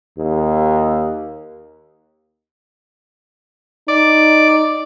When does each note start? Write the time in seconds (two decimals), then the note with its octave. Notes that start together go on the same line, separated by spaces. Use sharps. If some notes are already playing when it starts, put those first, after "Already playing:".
0.18 D#2
3.88 D#4 D5